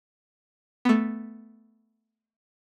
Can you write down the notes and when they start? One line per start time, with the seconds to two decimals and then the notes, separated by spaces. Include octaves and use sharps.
0.85 A3 B3